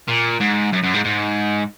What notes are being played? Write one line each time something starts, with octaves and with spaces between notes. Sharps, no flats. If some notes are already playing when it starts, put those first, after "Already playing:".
A#2
G#2
F#2
F#2
G#2
G#2